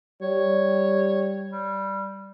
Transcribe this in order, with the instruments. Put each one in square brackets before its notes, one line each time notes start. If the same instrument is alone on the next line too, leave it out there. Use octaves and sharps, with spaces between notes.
[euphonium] G3 [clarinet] C#5
[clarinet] G3